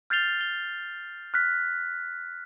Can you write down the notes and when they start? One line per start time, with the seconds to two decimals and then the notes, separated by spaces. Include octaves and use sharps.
0.10 F6 G6 A6 C7 F7 G7
0.41 G7
1.34 F6 F#6 B6